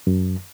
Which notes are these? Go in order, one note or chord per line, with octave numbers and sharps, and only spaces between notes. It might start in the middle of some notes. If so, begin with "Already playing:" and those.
F#2